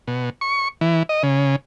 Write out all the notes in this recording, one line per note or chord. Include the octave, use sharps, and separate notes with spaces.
B2
C#6
E3
D#5
C#3